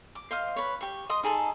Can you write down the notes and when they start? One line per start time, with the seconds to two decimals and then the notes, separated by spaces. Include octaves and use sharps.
0.15 D6
0.31 C5 D#5 F5
0.56 B4 C#5
0.81 G4 C#6
1.10 D#5 C6 D#6
1.23 D#4 G#4 A4 A5